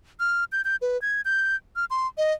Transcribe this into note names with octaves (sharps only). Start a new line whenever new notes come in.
F6
G6
G6
B4
G#6
G6
F6
C6
D#5